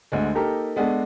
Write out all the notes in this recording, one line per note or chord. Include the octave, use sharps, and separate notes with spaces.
D2 D3 G#3
A#3 D#4 G4 A4 A#4
G#3 B3 D4 G#4 A4